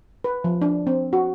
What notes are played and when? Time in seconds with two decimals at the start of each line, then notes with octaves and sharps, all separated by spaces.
0.24 B4
0.44 F3
0.62 D4
0.87 C4
1.13 F#4